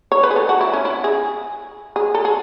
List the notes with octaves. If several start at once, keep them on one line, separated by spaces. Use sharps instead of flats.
C#5
B4
G#4
A4
F#4
E4
C#4
E4
G#4
G#4
A4
G#4